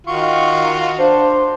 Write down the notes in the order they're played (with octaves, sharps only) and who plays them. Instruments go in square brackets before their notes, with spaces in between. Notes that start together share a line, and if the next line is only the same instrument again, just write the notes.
[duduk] D#3 [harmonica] F4 F#4 [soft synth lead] C#6
[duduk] D4 [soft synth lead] C5